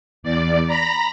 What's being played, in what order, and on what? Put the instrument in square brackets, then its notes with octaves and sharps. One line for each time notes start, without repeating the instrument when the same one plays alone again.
[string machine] E2 D5
A#5 B5 A#6